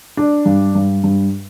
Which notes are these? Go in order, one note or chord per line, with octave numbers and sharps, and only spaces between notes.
D4
G2
G2
G2